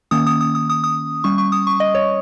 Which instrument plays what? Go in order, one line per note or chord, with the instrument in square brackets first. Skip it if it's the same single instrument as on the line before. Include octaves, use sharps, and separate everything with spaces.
[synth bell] D#3 A#3 C#4 D#6
D#6
D#6
D#6
D#6
D#6
G3 C#4 C#6
C#6
D#6
C#6
D#5
C#5